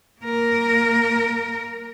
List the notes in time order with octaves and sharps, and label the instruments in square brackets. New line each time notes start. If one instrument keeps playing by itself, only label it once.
[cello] A#3 A#4